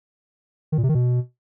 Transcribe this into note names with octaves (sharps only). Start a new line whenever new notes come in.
D#3
A#2
C3
D#3
B2